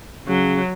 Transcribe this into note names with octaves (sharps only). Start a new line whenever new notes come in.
C#3 F#3